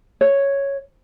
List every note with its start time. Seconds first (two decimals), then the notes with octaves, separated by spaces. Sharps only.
0.21 C#5